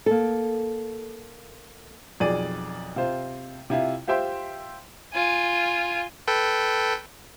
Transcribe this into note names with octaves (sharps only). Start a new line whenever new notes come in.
A#3 A4
B1 F2 G#4 D5 D#7
C3 F4 C5
C3 E4 F4
F4 G4 C5 E5 G5 C6
F4 G#5
A4 B4 G5